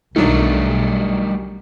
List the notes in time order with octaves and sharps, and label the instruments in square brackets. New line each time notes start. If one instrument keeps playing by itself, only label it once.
[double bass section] B1 B2 [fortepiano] D#3 F#3 D4 [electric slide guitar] G3 A3